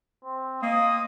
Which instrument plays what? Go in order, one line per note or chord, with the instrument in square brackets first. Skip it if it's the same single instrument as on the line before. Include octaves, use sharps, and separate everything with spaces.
[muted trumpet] C4
[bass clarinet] A#3 [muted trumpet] D#5 [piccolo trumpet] D#6